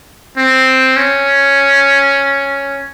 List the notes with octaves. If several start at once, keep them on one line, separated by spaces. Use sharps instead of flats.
C4
C#4